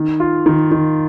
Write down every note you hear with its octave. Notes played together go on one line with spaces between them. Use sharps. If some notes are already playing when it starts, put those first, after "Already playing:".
Already playing: D#3
F4
D#3
D#3